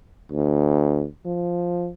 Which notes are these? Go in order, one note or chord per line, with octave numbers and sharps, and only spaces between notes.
D2
F3